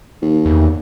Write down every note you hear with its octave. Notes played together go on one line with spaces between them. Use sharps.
D#2
E2